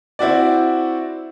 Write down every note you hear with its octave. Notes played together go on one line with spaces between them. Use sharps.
C4 E4 F#4 D5